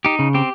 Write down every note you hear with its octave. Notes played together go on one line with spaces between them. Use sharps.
D#4 G4
C#3
C4 G4